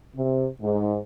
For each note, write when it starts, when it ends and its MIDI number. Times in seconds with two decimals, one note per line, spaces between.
0.16 0.48 48
0.60 0.97 44